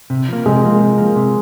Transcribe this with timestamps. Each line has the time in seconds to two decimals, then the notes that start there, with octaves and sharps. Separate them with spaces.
0.10 C3
0.28 F3 A#3
0.46 C3 G#3
0.63 F3 A#3
0.81 C3
0.98 F3 A#3
1.16 C3